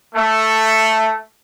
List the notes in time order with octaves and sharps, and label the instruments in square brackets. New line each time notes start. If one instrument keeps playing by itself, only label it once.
[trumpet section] A3